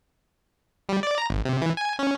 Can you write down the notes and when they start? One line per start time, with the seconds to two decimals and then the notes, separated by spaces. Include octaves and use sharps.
0.89 G3
1.03 D5
1.18 A#5
1.30 G#1
1.45 C3
1.62 E3
1.77 G#5
1.99 C#4